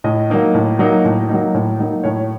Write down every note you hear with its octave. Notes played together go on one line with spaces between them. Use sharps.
A2 D#5
F#3 A#3 D#4
A2
F#3 A#3 D#4
A2
F#3 A#3 D#4
A2
F#3 A#3 D#4
A2 C#5